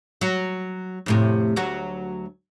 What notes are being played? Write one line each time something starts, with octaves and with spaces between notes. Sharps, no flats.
F#3 F#4
F2 A2 C3
D2 F#3 F#4